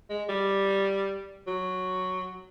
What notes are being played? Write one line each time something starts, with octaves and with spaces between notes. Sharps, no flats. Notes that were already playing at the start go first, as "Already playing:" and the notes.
G#3
G3
F#3